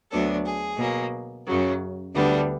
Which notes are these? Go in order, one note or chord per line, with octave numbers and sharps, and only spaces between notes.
D2 D3 F#3 B3 D4 A4
G#4
B2 F#3 A#3
F#2 C#3 F#3
D2 D3 G3 B3 D4